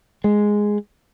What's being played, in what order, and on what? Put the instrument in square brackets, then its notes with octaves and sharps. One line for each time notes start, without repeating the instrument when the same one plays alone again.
[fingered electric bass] G#3